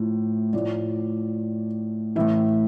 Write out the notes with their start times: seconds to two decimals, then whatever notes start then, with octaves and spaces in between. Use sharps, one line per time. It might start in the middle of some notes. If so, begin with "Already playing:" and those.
Already playing: A2 F3
0.53 A2 F3 D5
2.16 A2 E3 E5